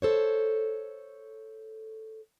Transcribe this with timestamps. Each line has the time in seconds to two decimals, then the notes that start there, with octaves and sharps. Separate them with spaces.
0.02 A4 C5 C#5